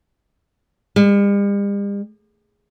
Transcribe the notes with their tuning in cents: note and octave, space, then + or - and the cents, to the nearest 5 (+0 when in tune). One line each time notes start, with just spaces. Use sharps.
G3 +45